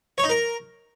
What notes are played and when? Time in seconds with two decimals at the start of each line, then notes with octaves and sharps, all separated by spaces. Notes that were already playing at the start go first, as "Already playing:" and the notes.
0.18 C#5
0.24 D#4
0.29 A#4